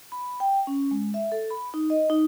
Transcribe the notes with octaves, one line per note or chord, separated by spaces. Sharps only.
B5
G5
C#4
G#3
E5
A4
B5
D#4
D#5
D#4